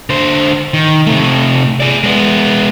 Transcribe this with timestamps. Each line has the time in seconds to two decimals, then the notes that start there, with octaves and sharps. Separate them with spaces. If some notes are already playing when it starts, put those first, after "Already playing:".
0.10 D3 C5
0.74 D#3
1.06 C3 A3
1.80 G#4 D5
2.04 G#3 B3